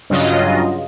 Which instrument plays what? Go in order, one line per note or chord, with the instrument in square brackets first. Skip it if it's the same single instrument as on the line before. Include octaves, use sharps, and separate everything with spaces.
[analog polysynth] G2 C#3 F#3 F4 D#5